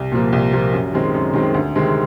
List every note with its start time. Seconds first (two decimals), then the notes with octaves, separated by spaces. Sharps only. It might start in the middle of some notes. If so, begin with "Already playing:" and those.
Already playing: C2
0.12 A#2 F3 A#3
0.32 C2
0.52 A#2 F3 A#3
0.72 F#2
0.93 D#3 G#3 C4
1.14 F#2
1.34 D#3 G#3 C4
1.54 D2
1.75 C3 D#3 G#3 C4